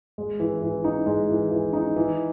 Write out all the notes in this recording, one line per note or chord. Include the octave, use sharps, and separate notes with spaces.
G#3
E3
E3
D#4
G#3
E3
E3
D#4
E3